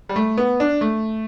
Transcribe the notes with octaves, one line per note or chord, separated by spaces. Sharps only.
G3
A3
B3
D4
A3